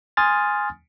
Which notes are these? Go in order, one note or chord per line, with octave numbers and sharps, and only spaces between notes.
G#5 C6 D#6 F6 A6